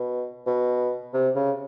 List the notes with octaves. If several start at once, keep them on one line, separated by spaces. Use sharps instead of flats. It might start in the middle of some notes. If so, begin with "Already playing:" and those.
Already playing: B2
B2
C3
C#3